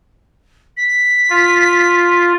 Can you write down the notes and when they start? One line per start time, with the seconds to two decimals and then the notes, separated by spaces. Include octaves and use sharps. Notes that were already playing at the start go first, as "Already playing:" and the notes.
0.77 B6
1.30 F4